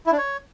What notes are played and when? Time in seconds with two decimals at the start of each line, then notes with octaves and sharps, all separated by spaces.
0.07 E4
0.12 D4
0.18 C#5